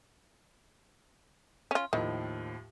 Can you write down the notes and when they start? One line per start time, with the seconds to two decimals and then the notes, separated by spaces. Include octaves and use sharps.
1.71 C#4 F4
1.93 D#2 A2 D#3 F3